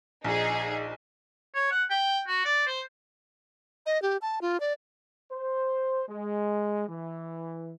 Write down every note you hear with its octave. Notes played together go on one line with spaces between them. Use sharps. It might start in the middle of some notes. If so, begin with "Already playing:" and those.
A#1 D#4 G#4
C#5
F#5
G5
F#4
D5
C5
D#5
G4
A5
F4
D5
C5
G#3
E3